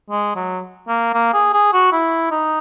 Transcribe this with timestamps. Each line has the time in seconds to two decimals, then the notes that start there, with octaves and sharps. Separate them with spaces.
0.10 G#3
0.36 F#3
0.88 A#3
1.14 A#3
1.33 G#4
1.53 G#4
1.73 F#4
1.92 E4
2.31 D#4